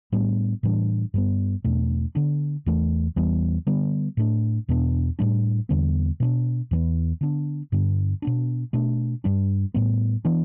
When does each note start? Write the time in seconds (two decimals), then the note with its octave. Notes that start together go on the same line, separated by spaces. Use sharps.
0.12 A2 G3 B3 D4
0.63 A2 E3 G3 D4
1.14 G2 G3 B3
1.64 E2 B2 A3 D4
2.15 D3 B3 D4
2.66 E2 E3 A3
3.16 E2 E3 G3 B3
3.67 D3 G3 B3
4.17 A2 A3 D4
4.69 E2 B2 B3 D4
5.19 A2 G3 D4
5.69 E2 D3 G3 B3
6.20 B2 B3 D4
6.71 E2 E3 G3 B3
7.21 D3 B3 D4
7.72 G2 D3 B3 D4
8.22 B2 B3 D4
8.73 B2 A3 D4
9.24 G2 G3 D4
9.74 A2 G3 B3
10.25 E3 B3 D4